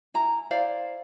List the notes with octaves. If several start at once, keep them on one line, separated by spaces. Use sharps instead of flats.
E4 G#5 A#5
E4 C5 D5 F5